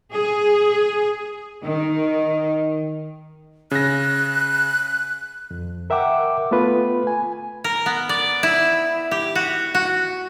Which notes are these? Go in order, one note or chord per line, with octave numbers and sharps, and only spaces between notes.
G#4
D#3
C#3 F#6 A#6
F2
A#4 E5 F#5 G5 D6
A3 B3 F4 B4
G#5
A#4
B3
D5
E4
G4
F#4
F#4